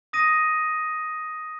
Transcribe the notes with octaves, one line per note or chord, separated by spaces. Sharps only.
D#6 A#6 D#7